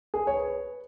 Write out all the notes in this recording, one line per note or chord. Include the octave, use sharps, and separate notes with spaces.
G#4
C#5
B4